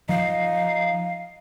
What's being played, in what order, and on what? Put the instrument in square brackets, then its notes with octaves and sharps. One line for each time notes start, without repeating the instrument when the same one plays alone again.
[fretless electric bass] F3 [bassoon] D#4 [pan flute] F5